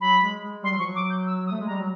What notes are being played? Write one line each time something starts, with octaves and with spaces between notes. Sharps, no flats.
F#3 B5
G#3
G#3
G3 C6
F#3
F3 C#6
F#3
D6
G6
E6
D#6
A3
G#3
A#5
G3
F#3